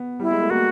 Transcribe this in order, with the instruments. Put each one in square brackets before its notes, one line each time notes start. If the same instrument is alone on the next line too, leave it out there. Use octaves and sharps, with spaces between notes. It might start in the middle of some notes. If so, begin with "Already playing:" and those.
Already playing: [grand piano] B3
[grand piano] G3 [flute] E4
[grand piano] G#3
A3
[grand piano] A#3 [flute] F#4